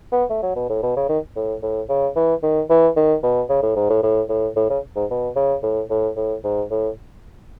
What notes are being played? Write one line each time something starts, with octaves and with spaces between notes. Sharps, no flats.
B3
A3
F#3
B2
A2
B2
C#3
D#3
A2
A2
C#3
E3
D#3
E3
D#3
B2
C#3
A2
G#2
A2
A2
A2
A2
C#3
G#2
B2
C#3
A2
A2
A2
G#2
A2